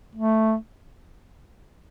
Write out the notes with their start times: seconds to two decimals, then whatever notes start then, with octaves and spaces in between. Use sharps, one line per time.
0.15 A3